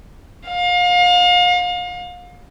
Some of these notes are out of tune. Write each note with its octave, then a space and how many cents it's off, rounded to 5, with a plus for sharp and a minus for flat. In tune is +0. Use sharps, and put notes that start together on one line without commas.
F5 +35